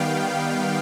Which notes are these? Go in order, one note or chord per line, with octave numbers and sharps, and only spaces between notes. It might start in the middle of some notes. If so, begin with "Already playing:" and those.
Already playing: D#3 G3 B3 F5 G5